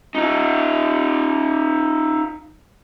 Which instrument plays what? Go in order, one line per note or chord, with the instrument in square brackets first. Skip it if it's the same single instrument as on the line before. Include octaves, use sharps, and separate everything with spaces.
[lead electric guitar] D#4 F4